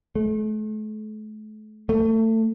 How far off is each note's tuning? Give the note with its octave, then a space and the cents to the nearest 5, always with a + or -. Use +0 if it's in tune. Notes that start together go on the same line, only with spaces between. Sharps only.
A3 -40
A3 +25